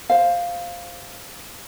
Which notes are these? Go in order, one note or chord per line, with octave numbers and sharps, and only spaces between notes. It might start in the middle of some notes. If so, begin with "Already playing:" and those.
C5 F5